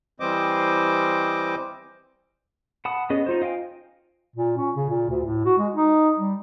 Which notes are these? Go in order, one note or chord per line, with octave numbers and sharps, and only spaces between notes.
E3 G3 C4 C5 D#5 D6
F#5 A5 B5 D#6
B3 C#4 G#4 D#5
D#4 F4 C5
D#5 F5 G5 G#5
A#2
C#4
C#3
A#2
D2
A2
F#4
G#3
D#4
G3